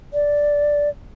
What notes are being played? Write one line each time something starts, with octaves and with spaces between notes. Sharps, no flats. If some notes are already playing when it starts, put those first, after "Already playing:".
D5